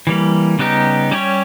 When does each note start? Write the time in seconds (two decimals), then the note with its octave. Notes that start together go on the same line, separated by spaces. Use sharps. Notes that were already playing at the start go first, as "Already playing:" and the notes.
0.07 E3 G3 A#3
0.59 C#3 G3 B3 D#4 G4
1.11 G3 C#4 G4 C#5